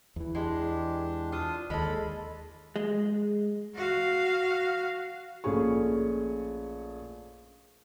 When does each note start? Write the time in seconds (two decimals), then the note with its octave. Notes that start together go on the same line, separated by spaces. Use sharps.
0.16 E2 E3
0.35 G#3 D4 G4
1.32 D4 F4 D#6
1.70 D#2 G#3 A4 B5
2.76 G#3
3.75 F#4 F5
5.44 A#1 A3 C#4 G#4 C#6